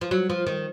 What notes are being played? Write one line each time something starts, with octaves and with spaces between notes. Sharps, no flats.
F3
F#3
F3
D#3